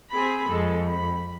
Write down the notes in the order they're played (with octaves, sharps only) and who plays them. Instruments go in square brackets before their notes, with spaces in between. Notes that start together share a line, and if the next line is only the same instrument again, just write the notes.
[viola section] C4 G#4 B5
[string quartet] F2 [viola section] G#3 A4
[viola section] B5